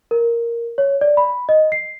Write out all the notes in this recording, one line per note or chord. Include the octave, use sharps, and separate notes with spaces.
A#4
C#5
D5
B5
D#5
C7